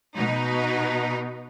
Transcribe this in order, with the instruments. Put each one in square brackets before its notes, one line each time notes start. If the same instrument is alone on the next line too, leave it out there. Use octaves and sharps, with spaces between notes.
[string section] B2 D#4